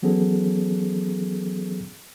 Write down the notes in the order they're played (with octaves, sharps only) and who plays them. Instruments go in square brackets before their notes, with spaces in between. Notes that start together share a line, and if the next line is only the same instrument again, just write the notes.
[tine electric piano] E3 F#3 B3 C#4 G#4 A4